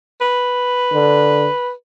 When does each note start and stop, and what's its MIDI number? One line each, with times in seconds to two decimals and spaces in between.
0.21 1.72 71
0.93 1.47 50